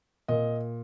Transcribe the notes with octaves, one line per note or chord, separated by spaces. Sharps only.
A#2 D#5